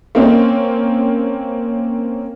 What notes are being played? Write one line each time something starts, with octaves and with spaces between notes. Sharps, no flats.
A#3 C4 C#4